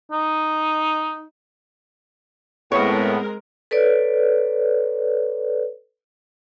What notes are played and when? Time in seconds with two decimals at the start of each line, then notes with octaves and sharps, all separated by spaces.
0.12 D#4
2.72 A2 G#3 B3 C4 A#4 C#5
3.71 A4 B4 C#5 D5